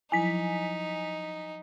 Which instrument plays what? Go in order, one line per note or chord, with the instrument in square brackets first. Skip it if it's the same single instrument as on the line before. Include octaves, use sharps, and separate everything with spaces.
[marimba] F3 F#3 E4 [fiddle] D#4 [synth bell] G#5 B6